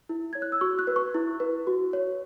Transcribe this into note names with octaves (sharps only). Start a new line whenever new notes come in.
E4
C#5 G#6
F#6
E6
F#4 C#6
F#6
B4
C#6
E4
B4
F#4
C#5